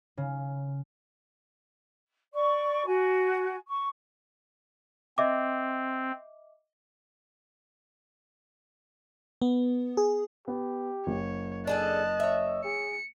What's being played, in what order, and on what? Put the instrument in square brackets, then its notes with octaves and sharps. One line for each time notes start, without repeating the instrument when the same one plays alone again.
[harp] C#3
[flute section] D5 C#6
F#4 G#5
C#6
[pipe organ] C4 [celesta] D#5 E5 D6
[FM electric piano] B3
G#4
[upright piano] B3 [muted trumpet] G4
[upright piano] F#1 [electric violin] C#5
[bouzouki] D4 G#4 A4 [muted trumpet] D#5 [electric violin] A5 F#6
[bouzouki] C#5 E5
[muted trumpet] G#4 [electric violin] C#7